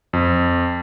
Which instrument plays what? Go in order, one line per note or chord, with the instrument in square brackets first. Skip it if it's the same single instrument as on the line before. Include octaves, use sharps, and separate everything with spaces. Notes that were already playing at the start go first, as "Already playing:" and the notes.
[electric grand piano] F2